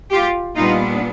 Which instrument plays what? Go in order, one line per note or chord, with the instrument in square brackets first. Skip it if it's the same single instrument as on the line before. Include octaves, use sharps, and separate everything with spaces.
[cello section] F4 G4
A#2 G3 B3 D4 D#4 F4